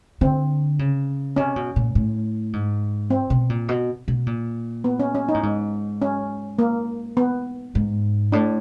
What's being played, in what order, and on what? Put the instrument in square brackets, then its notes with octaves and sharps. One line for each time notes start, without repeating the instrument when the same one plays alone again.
[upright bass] D3 [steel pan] C4
[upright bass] C#3
[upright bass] C3 [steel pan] C#4
[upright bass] B2
A#2
A2
G#2
[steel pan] C4
[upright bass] B2
A#2
B2
B2
A#2
[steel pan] B3
C#4
C#4
D#4
[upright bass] A2
G#2
[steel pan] C#4
A#3
B3
[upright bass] G#2
[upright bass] A2 [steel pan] D4